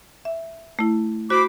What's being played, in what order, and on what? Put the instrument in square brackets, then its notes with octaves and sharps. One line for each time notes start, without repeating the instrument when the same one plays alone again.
[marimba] E5
A3 E4
[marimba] F#4 [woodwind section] C5 B5 D6